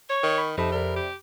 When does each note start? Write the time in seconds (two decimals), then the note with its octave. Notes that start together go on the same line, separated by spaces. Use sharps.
0.10 C#5 C#6
0.23 D#3
0.38 B5
0.58 F2 C3 D#4 A4 A5 B5
0.72 A#4 D5
0.96 G4